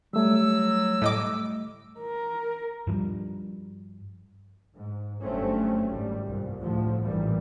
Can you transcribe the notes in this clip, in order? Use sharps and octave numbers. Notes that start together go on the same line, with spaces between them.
F#3 G3 A3 E6
A2 D#5 D6
A#4
G2 F3 G3
G#2
F#1 G2 A3 C4 C#4
G#1 G3
C2 G2 A#2
D2 A2 F3
A1 G2 A#2 E3 G3